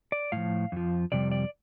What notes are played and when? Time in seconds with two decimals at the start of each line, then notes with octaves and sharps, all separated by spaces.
0.12 D5
0.32 A2 F3 F5
0.72 F2 F3
1.12 F2 C3 G3 D5
1.31 D5